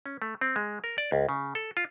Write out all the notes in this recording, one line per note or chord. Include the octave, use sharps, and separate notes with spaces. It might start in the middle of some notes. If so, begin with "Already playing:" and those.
C#4
A3
C4
G#3
A#4
D5
C#2
C#3
A4
F4